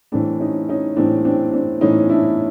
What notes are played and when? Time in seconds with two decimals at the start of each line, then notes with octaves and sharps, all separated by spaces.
0.12 A2 E3 C4 D4
0.40 C#4 D#4
0.69 C#4 D#4
0.96 A2 E3 C4 D4
1.25 C4 D4
1.53 C4 D4
1.81 A2 E3 C#4 D#4
2.09 D4 E4